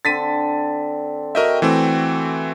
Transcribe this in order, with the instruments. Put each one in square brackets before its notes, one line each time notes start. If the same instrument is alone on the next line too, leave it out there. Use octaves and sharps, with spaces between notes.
[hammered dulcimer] D3 C4 [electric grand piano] A6 B6 D#7
[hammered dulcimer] F#4 G5 [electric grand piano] A#4 D#5 E5
[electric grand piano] E3 A3 C4